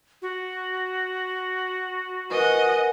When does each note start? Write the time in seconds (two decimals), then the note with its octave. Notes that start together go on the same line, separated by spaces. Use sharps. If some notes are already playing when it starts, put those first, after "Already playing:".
0.22 F#4
2.32 A#4 B4 D#5 F#5 G#5